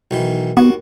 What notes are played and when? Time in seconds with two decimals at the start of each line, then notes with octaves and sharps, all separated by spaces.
0.11 B1 D#3 E3
0.57 D#2 B3 F#4